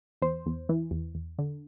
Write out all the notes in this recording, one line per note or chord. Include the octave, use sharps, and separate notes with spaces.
E2 C5
E2
E3
E2
E2
D3